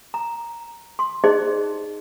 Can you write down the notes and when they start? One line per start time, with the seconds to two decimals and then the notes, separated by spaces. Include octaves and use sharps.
0.14 A#5
0.99 C6
1.24 D#4 G#4 C5 D5 D#5